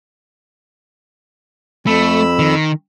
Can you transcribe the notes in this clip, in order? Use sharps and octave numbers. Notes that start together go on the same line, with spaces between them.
F2 A3 B5 E6
D#3